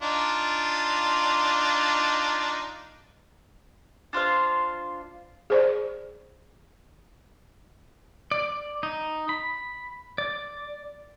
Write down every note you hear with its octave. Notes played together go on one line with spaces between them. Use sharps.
D4 D#4 F4
D4 F4 C5 F5
G#4 C5 D5
D5
D#4
B5
D5